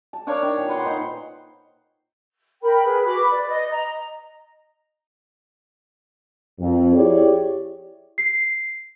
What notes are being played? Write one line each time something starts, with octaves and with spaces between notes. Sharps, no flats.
A5
D4 A#4 C#5 F5
D#3
A#2
B4 F#5 C6
A#2 D#4 C5 D#5
A#4 G5 B5
G#4 B4
F#4 B5 D6
B4 D5
D#5
D#5 A#5
F2
E4 G4 G#4 C#5 D5
C7